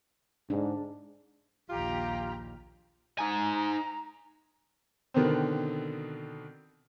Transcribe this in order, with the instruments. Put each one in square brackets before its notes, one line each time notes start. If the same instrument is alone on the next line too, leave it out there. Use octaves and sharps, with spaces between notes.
[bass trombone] G#2 [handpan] D4
[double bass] A#1 D#2 [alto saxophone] F4 [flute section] G4 A#5
[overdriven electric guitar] D#4 G#5 [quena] A#5
[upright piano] B2 D3 D#3 B3 C4